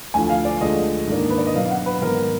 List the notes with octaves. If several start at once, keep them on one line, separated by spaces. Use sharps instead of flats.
D2 D3 F3 G#5
F5
D5
D2 D3 F3 G#3 D#5
G#2 D#3 A#3 D4
B4
D5
D#5
B2 F#3 D4 F5
F5
F#5
B4
G#2 D#3 F#3 B3 A#4